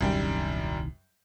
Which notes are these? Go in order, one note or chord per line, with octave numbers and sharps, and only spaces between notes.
D#1 C2 F#2 D#3 G3 G5